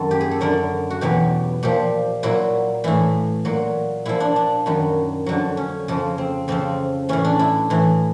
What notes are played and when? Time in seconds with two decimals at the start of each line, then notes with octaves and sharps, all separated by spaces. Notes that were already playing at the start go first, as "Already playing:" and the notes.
Already playing: F#2 D#3 F#3 A4
0.11 G4
0.21 G#4
0.31 A4
0.41 F#2 D3 F#3 A#4
0.90 F#4
1.01 E2 B2 F#3 G4
1.63 A#2 F3 G4
2.23 A#2 F#3 E4
2.84 A2 E3 E4
3.45 A#2 F#3
4.06 A#2 F3 E4
4.20 D4
4.36 D4
4.66 F#2 D#3 F#3
5.26 F2 D3 F#3
5.57 C#4
5.88 F2 C#3 F3
6.18 C4
6.48 F2 C#3 F3 C4
7.09 A2 E3 C#4
7.25 D4
7.39 E4
7.70 A2 E3